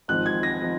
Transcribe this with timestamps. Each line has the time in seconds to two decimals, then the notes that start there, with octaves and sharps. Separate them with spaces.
0.08 G#1 G#2 F3 C4 D#4 F#6
0.26 G#6
0.43 A#6
0.62 F3 C4 D#4